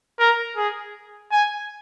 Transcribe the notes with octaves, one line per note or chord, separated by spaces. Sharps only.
A#4
G#4
G#5